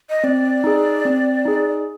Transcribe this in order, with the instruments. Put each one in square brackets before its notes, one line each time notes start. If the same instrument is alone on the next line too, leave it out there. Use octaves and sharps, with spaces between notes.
[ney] D#5
[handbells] C4 [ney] D5
[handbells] D#4 G#4
C4
D#4 G#4